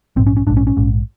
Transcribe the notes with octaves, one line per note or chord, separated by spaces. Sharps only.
A#1 G#2 C4
C#4
C#4
A#1 G#2 D4
C#4
C#4
A#1 G#2